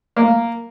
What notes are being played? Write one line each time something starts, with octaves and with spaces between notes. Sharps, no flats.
A#3